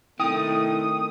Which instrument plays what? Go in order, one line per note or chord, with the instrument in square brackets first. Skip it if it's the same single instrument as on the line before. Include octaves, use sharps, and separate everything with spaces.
[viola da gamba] D#3 A3 C4 [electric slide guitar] E4 G5 [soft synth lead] D#6